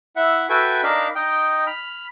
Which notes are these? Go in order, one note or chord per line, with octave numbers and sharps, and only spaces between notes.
E4 E5 F#5
F#4 A4 B4 E5 G5 G#5
D4 D#4 A#4 F5 B5
D#4 D#5 G5
B5 F6